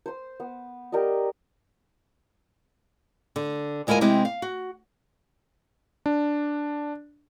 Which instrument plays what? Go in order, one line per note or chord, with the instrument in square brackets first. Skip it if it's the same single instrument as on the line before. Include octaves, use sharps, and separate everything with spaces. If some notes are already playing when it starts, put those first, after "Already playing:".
[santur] C5 C6
B3
G4 A#4 D5 D#5
[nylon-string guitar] D3
D2 G#3 E4 F4 A#4 G#5
C3 G#3 C4 E4 G4
F5
F#4
[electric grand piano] D4